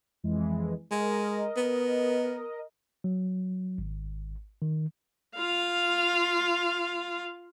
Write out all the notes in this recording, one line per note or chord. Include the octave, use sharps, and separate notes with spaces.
F2 E3 G#3
G#3 A#4 D#5
B3
F#3
G#1
D#3
F4 F5